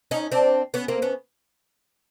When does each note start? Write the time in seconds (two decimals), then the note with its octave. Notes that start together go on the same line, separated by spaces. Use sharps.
0.11 C#4 D#4
0.32 C4 D4
0.74 B3 C#4
0.88 A#3 C4
1.02 B3 C#4